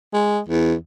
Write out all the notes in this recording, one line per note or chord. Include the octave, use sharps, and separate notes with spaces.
G#3
E2